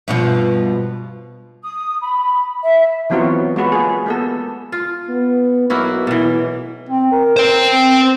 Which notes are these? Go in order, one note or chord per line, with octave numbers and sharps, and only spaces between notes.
G2 B2 F3
D#6
B5
E5
E3 F#3 B3 C4 F4 F#4
G#3 F4 F#4 B4
A#3 G#4
A#3 B3 A4
F4
B3
B1 A#3 E4 F#4
B2 E3
C4
A#4
C5 G5
C4